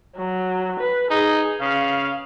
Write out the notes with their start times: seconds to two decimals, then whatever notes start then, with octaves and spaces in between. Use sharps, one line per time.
0.17 F#3
0.80 B4
1.11 D#4 G#4
1.61 C#3 F5